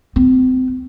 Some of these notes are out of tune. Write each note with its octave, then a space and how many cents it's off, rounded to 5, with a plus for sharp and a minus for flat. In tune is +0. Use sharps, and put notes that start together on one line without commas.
C4 -30